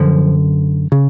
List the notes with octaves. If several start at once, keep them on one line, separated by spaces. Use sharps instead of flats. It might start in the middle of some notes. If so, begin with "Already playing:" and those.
Already playing: F#2 D3 F3
C#3